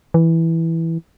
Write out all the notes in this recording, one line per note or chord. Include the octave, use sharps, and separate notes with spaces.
E3